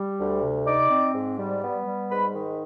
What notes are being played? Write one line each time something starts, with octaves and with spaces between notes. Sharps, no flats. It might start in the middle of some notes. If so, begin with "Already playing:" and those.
Already playing: G3
D2
C3
D#4 D5 D6
C4
G#2
G3
B3
G3
G#2 B4 B5
D#3